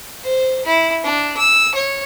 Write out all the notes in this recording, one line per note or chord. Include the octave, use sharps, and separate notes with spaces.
C5
E4
D4
E6
C#5